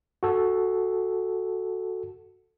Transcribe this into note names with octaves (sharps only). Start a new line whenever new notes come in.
F#4 A4